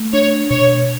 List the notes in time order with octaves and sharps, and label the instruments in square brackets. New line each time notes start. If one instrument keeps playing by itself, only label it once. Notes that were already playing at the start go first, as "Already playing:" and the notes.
Already playing: [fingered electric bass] A3
[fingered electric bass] D4 [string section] C#5
[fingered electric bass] B2 [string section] C#5